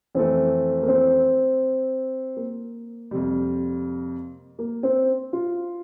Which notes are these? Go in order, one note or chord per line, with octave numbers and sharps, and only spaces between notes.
F2 E3 A3 C4
A#3
C4
A#3
F2 C3 G3
A#3
C4
F4